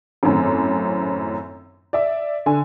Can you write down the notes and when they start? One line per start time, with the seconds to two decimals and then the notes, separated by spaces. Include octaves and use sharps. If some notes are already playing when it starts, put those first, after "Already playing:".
0.23 G#1 F#2 A2
1.93 D5 E5
2.46 D3 G#5